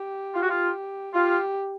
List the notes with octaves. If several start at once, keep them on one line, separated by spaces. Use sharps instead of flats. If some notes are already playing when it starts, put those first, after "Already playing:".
Already playing: G4
F4
F#4
F4
F4 G4